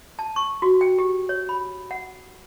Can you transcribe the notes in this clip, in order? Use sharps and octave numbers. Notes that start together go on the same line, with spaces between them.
A5
C#6
F#4
G5
G4
C#5
B5
F#5